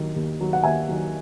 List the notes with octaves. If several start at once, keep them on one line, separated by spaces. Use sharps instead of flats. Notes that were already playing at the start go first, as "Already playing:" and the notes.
Already playing: D#2 D#3 F#3
D#2
D#3 F#3
F#5
D#2 E5 G#5
D#3 F#3